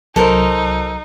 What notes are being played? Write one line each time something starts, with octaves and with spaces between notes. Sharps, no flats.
C2 F#3 D#4 A4 A#4 C5